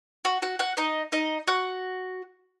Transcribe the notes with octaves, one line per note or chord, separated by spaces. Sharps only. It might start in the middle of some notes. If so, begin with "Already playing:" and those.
F#4
F#4 F#5
F#4 F#5
D#4 D#5
D#4 D#5
F#4 F#5